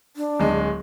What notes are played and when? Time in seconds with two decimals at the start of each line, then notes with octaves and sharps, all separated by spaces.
0.16 D4
0.40 D1 G#3